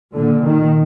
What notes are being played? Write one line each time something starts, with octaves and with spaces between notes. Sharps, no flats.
A#2 D3
D#3